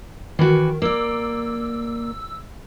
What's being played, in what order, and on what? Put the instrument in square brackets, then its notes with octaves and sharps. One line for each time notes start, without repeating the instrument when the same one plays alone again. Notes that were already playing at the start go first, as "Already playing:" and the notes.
[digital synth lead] D#3 [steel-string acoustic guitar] E3 F#4
[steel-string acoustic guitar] A#3 D5 [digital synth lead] E6